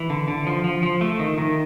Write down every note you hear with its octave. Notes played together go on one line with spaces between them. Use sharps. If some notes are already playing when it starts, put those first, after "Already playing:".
Already playing: E3
D3
D3
F3
F3
F3
A3
D#3
D#3